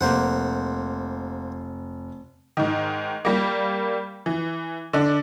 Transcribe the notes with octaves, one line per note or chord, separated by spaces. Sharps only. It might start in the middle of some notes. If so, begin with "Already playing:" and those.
F1 A#3 C5 F#5
G#2 D#3
G3 A#3
E3
D3 D4